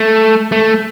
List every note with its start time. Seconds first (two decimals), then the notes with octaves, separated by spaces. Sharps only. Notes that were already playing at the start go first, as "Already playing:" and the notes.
Already playing: A3
0.52 A3